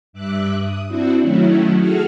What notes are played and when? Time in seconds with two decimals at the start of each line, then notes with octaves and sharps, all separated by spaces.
0.13 G2 E5 D6 F#6
0.57 D#6
0.88 C4 D4 E4 F#4
1.22 D#3 F#3 A3 C#4 E4
1.77 F#4 G#4 A4 F6